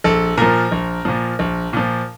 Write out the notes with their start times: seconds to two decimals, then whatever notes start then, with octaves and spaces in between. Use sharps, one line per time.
0.04 A#1 A4
0.37 A#2 F3 A#4
0.72 A#1
1.05 A#2 F3
1.39 A#1
1.73 A#2 F3